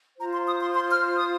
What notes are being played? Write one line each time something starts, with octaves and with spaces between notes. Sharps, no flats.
F4 C5 A#5
C6
D#6
C6
C6
F6
D#6